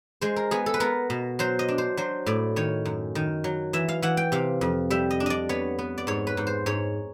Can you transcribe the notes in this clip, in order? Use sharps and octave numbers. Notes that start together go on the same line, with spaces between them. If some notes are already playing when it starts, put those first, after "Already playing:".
G#3 C5
A#4
B3 G#4
A4
B4
B3 A#4
B2
F#3 C5
D#5
D4
C5
F#3 C5
A2 D5
D#3 C#5
F#2
D#3
F#3
E3 E5
F5
E3 F#5
G5
C3 F5
F2
G3 E5
D#5
D4
D5 D#5
B3 C#5
B3
D5
G#2 C#5
B4
G#2
C5
G#2 C#5